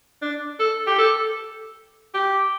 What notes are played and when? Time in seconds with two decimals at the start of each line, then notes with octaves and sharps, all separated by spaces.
0.22 D4
0.60 A4
0.87 G4
0.99 A4
2.14 G4